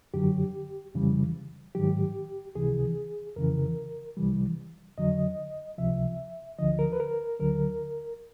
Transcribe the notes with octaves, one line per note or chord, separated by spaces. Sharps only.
F#2 D3 F#3 G4
F2 C#3 E3 G3
G#2 D#3 F#3 G4
C#2 C3 E3 G#4
F2 C#3 E3 A#4
C2 C3 E3 G3
F2 D3 F#3 D#5
C#2 C3 F3 E5
D2 D3 F3 D#5
A#4
B4
A#4
D2 D3 F#3 A#4